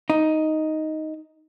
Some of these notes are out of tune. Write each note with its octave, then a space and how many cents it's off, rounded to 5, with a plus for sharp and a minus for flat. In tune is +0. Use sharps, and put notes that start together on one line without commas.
D#4 +5